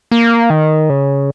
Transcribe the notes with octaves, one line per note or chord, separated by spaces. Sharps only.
A#3
D#3
C#3